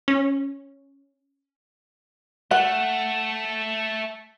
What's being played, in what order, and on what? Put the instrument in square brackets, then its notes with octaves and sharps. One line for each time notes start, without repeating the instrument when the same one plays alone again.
[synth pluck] C#4
[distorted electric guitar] A3 [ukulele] F#5